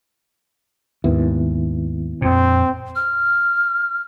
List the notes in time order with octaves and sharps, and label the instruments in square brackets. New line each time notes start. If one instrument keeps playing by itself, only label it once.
[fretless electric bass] D#2 G#2 [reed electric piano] D#3 B3 E4
[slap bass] F2 A#2 [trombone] C4
[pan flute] F6